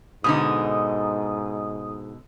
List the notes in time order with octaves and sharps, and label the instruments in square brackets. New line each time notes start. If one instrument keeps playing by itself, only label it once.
[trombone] G#2 [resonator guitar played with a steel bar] B2 D3 D#4 [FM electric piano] D#6